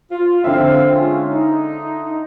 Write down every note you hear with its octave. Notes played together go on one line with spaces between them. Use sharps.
F4
D3 C4 E5 F5
G#3 C#4 F4
D#4